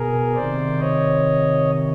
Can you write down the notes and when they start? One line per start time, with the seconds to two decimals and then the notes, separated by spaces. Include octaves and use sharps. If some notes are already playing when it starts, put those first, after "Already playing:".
Already playing: B2 G#4 A#4
0.35 C3 D#3 C5 D5
0.79 C#5 D#5